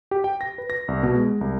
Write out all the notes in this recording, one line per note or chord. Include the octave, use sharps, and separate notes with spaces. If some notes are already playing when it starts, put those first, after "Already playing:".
G4
G5
A#6
B4
A#6
C2
B2
G#3
C2